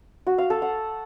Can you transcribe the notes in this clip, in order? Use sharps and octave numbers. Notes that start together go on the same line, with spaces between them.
F#4
F5
A4
F#5